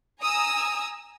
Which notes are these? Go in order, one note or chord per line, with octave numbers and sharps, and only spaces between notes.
G#5 A#5 D#6 E6